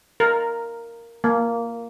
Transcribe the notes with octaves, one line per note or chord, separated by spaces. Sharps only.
A#4
A#3